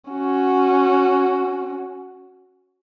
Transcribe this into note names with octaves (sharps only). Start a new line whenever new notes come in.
C#4 F#4